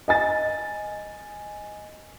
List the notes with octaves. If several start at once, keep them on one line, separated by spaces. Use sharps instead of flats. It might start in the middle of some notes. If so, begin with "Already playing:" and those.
D#5 G#5 A6